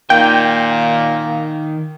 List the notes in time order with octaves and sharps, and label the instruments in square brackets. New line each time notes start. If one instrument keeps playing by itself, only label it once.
[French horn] A#2 [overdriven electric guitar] D#3 [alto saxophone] A#3 [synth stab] G5